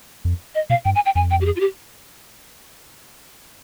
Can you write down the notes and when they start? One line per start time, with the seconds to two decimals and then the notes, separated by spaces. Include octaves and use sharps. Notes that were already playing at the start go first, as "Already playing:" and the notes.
0.25 F2
0.55 D#5
0.70 B2 F5
0.85 G2 G5
0.95 G#5
1.06 G5
1.15 F2 G#5
1.31 G5
1.41 G4
1.45 G#4
1.56 F4
1.60 G4